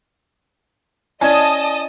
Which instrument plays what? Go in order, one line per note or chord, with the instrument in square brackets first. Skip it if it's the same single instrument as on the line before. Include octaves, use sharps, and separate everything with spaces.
[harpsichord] C#4 [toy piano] E4 D5 [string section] D#5 A5 D#6